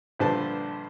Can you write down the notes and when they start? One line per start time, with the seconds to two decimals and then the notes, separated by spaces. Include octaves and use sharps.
0.19 A#1 G2 D3 B4 C5 A5